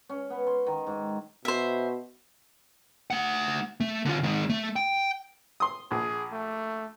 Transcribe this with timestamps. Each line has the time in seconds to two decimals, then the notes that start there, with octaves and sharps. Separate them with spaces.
0.09 C#4
0.30 B3
0.47 C6
0.67 D#3
0.87 G#2
1.45 B2 C5 E5
3.10 A3 F#5
3.80 A3
4.05 D3 F4
4.23 D#3 G#3
4.49 A3
4.76 G5
5.60 C6 D#6
5.91 A#1 G#4
6.32 A3